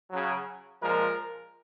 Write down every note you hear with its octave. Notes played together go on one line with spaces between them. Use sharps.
C#3 F#3
A#2 F3 G#3 A#4